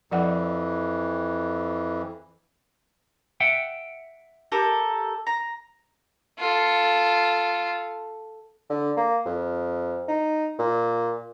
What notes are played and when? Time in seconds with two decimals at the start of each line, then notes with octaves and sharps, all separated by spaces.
0.11 F2 E3 F3 D5 F#5
3.40 E5 F#5 G5
4.52 G4 A4 A#4
5.27 A#5
6.39 F4 A4
8.70 D3
8.97 A#3
9.26 F2
10.08 D#4
10.59 A#2